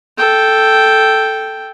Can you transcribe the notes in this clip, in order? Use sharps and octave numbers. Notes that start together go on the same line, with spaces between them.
A4 G5